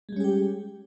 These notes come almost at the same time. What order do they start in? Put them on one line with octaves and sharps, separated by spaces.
G#3 G3 C#4 G#4 G4